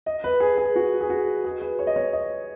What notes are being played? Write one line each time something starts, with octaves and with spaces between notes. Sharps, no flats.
D#5
B4
G#4
G#4
F#4
G#4
F#4
G#4
B4
C#5
D#5
C#5
D#5